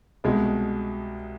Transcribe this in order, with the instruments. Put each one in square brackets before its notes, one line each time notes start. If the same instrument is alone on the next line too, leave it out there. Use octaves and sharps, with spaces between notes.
[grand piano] C2 B2 G#3